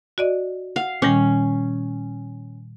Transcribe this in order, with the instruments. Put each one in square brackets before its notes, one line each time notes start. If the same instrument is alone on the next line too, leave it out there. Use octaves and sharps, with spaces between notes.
[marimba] F#4 D5 D#5
[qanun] F5 [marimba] F#5
[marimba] A#2 D#3 G3 [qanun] C#4